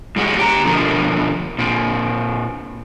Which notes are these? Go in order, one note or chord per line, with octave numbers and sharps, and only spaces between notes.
G2 G#3 F#4
G4 A#5
B2 D3 F3 A#4
A#2 C4